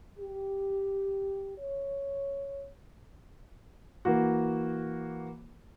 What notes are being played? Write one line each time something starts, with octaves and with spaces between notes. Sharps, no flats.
G4
C#5
E3 A#3 F#4